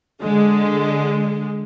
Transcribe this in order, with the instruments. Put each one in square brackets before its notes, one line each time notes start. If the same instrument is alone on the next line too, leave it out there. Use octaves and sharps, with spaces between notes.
[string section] D3 G#3